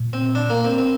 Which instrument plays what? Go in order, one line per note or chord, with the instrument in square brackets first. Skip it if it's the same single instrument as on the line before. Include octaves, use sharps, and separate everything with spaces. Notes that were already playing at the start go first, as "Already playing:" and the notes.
Already playing: [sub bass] A#2
[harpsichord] C4
D4
A#3
C4
C4